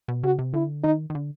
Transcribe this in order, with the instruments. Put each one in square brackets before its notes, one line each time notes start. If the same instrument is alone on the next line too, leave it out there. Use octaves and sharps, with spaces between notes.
[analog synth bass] B2
[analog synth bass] C#3 [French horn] F#4
[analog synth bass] C3
[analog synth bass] D3 [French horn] E4
[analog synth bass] D#3 [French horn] D#4
[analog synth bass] D#3
D3